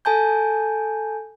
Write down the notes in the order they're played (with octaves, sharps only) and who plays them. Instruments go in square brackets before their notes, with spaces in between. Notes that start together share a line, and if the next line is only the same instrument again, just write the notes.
[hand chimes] A4 G#5 A5 G6